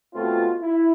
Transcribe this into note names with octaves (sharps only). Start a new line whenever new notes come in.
B2 A3 C4 F4
E4